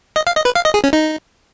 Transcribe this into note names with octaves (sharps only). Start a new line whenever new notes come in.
D#5
F5
D#5
B4
F5
D#5
G#4
C#4
D#4